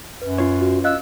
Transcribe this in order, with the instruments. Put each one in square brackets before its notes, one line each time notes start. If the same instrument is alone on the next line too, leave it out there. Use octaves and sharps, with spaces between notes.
[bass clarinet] F#2 [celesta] B4
[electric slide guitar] C#4 F4 C#5
[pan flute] F#4
[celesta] D#5 F5 F#6 [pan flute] E6